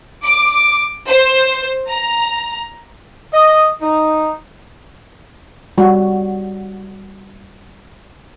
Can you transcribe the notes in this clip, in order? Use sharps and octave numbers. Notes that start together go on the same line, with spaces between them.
D6
C5
A#5
D#5
D#4
G3 F#4